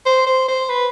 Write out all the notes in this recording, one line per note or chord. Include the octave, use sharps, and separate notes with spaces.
C5
C5
C5
B4